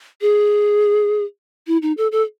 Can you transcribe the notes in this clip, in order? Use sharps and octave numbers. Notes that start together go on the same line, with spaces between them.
G#4
E4
D#4
A4
A4